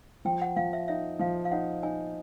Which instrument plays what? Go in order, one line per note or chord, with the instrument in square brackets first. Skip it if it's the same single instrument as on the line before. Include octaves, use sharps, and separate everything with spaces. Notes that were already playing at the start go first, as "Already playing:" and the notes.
[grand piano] F3 [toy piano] G5
[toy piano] F#5
[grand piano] F3 [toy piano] F5
[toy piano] E5
[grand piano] D#4 [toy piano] E5
[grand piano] F3 [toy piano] F5
[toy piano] F5
[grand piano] D#4 [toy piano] F#5
[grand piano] D#4 [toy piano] G#5